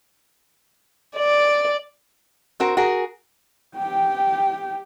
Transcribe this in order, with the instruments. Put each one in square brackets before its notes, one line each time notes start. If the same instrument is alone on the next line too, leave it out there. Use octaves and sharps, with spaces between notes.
[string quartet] D5
[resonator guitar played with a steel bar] C4 F#4 A#4
F#4 G#4 A#4
[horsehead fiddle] G4 G5